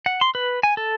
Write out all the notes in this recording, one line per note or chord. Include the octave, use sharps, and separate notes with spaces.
F#5
C6
B4
G#5
A4